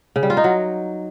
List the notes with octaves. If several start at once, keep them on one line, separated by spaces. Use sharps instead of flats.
C#3
G3
F4
D#4
F#3